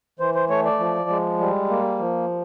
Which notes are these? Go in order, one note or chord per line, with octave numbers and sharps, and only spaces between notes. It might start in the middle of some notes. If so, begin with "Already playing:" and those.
E3 C5
C5
A3 C#5
D5
F3
G#3
G3
A#3
F3